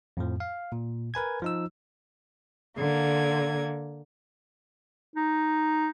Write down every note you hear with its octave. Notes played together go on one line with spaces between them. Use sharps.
F2 A2 F3
F5
A#2
A#4 B4 G#5 G#6
F3 D#4 E6
D3 A#3 G#6
D#4